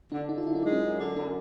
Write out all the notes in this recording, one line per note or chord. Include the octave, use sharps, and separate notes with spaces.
D3 D4
D3 D#4
F4
F#2 E4
D#4
G#3
C#4
F#2
D3
F#2 D4